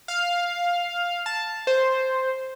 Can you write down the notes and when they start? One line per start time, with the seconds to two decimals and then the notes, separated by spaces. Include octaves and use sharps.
0.08 F5
1.26 A5
1.67 C5